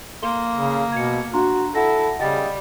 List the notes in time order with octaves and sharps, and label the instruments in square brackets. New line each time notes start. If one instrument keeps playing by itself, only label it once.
[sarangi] A#3 [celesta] A4 C6 G7
[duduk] C#3
[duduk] B2 [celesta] G#6 C#7
[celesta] D4 A#5 C6 [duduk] F#4
[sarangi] E4 [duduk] A4 [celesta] F#5 A#6
[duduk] C#3 [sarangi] G3 [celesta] D#5 G5 A6